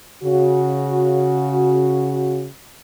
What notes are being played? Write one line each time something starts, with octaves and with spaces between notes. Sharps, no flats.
C#3 F#4